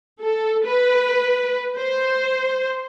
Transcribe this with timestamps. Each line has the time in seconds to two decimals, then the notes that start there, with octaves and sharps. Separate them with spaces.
0.22 A4
0.65 B4
1.79 C5